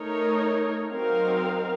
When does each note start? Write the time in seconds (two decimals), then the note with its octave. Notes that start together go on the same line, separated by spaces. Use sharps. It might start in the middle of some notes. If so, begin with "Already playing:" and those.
Already playing: A3 D#4 A#4 C#5
0.91 F#3 C4 D#4 A#4 F5